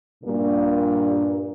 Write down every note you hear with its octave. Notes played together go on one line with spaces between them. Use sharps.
G2 A#2